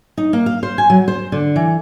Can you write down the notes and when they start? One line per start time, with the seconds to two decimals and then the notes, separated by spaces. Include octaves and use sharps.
0.17 D#4
0.33 A#3
0.46 F5
0.63 C5
0.78 G#5
0.90 F#3
1.08 C5
1.32 D3
1.56 E3